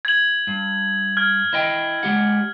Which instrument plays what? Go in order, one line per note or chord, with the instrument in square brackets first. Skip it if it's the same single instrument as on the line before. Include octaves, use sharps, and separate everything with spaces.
[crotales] G#6 F#7
[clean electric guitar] G2
[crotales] F6 G#6
[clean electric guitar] E4 D#5 G5
G#3 G4 F#5